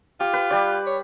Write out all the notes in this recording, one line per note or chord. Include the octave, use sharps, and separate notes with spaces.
F4 G4
B4
G3 G4 D5
C#5